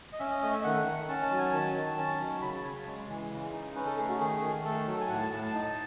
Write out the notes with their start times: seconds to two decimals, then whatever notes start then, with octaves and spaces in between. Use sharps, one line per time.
0.13 D#5
0.19 C#4 E5
0.31 D#5
0.42 A3 D#5
0.53 E5
0.64 D#3 F#5
0.86 D#3
1.09 C#4 A5
1.23 A5
1.31 F#3
1.38 G#5
1.53 D#3 A5
1.76 D#3
1.97 C#4
2.20 F#3
2.42 C#3 B5
2.54 A5
2.64 C#3 C#5
2.86 G#3
3.08 E3
3.31 C#3
3.53 D#4
3.75 C#4 B4
3.86 A4
3.98 A3 G#4
4.09 F#4
4.20 D#3 G#4
4.42 D#3
4.64 A3 A4
4.87 F#3
5.01 G#5
5.09 A2 F#5
5.20 A5
5.31 A2 A5
5.42 A5
5.54 D#4 A5